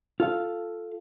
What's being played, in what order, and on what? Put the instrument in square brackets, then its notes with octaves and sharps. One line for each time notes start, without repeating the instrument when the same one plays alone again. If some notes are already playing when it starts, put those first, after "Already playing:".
[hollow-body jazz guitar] F4 A4 F5